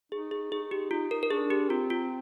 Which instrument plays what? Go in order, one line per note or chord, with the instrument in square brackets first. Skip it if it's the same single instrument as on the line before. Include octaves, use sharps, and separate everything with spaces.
[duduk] D#4 [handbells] G#4
[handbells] G#4
[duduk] D#4 [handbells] G#4
[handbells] G4
[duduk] D#4 [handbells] F4
[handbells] A#4
A#4
[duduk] D4 [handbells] G#4
[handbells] G4
[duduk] C4 [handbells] F4
[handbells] F4